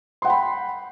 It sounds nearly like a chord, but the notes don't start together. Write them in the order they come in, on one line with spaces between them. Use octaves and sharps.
C6 F#5 G5 B5